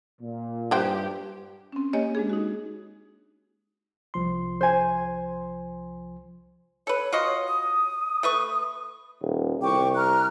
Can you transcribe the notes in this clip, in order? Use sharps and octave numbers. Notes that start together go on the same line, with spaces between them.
A#2
G2 E3 G4 C5 G5
C4 C#4
A#3 G4 C#5 D#5 G#5
G#3 D4 G#4
D#4 F#4
C2 F3 C6
C5 G#5
A4 B4 C#5
F4 F#4 D#5
D#6
A3 B4 C#6
D#1
C2 G5 C#6 D6
A#5 F6 F#6